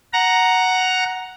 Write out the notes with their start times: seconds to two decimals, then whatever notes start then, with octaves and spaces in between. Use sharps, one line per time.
0.13 F#5 A#5